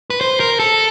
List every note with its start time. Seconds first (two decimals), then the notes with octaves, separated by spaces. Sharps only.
0.10 B4
0.21 C5
0.40 A#4
0.60 A4